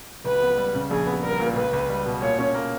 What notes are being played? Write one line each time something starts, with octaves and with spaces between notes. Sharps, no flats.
C#2 B4
B3
G3
C#3
A#1 G#4
B3
G3 A#4
A#2
C#2 B4
C#2
G3
B2
A#2 C#5
C#4
A#3